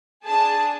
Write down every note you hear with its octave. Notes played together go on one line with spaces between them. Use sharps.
D4 G#4 A5